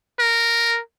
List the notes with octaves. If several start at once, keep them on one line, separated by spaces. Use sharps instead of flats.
A#4